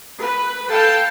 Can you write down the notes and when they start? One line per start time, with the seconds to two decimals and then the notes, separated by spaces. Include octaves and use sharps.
0.19 B4
0.71 A4 F5 G5 A5